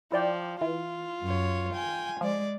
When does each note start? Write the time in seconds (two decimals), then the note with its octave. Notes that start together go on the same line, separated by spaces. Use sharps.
0.12 F3 E4 D5 G5
0.61 E3 F4
1.24 F#2 C#5
1.75 G5 G#5
2.21 F3 G#3 D5